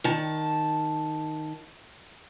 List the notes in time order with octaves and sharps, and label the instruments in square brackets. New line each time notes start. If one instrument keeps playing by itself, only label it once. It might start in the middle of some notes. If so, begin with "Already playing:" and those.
[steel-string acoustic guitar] D#3 A5